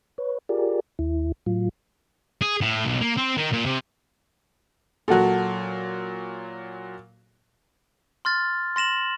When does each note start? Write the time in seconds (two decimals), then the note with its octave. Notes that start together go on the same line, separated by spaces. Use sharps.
0.18 B4 C#5
0.49 F4 G4 G#4 A#4 D5
0.99 D#2 E4
1.46 A2 F#3 F4
2.41 G#4
2.61 A2
2.85 B1
3.02 A#3
3.18 C4
3.38 D#3
3.53 A#2
3.65 C3
5.08 A#2 F#3 F#4 A4
8.25 C6 F6 A6
8.76 C6 A#6 E7 F#7